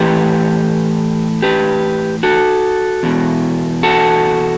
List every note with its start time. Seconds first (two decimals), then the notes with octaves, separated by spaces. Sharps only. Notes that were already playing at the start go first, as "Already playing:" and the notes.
Already playing: A2 E3 G4 B4
1.42 G4 B4
2.23 F#4 A4
3.03 E2 B2
3.83 F#4 A4